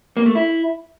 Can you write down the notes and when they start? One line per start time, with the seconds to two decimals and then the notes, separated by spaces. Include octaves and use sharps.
0.17 A#3
0.26 A3
0.35 E4